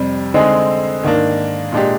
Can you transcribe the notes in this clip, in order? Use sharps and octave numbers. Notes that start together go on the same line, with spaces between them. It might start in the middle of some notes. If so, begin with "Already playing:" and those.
Already playing: F2 C3 G3
D3 G#3 C4 D#4 G#4
G#2 D#3 A#3 D4
A#2 G#3 D4 G4